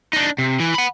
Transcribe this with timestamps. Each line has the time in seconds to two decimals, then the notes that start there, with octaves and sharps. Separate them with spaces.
0.13 D4 D#4
0.38 C3
0.60 E3
0.74 F#5 B5